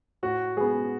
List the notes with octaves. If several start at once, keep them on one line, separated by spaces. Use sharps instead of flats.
A2 F#4
G#3 B3 G#4